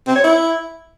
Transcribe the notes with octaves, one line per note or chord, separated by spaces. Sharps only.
C4
C#5
E4